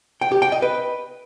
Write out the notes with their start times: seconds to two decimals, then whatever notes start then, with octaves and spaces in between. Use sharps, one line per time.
0.21 G5
0.32 G4
0.42 G5
0.52 D#5
0.62 B4